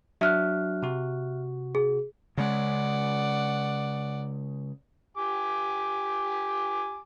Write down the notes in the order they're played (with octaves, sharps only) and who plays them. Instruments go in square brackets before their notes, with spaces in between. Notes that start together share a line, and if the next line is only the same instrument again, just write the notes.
[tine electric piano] F#3 D4 F#4 [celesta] E5 F6 F#6
[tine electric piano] C3 F#4
[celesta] G#4
[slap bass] C#3 G#3 [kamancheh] D5 F#5
[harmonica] G4 G#5 D6